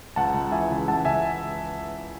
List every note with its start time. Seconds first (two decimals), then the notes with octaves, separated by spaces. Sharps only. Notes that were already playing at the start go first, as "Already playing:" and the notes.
0.16 C#2 F#5 A5
0.34 C#2
0.52 E3 E5 G#5
0.71 C#3
0.88 C#2 F#5 A5
1.05 C#2 E5 G#5